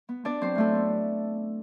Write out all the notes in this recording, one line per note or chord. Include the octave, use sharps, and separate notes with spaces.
B3
B3 D4 D5
F#3 C4 C5
A2 A3 A4
B3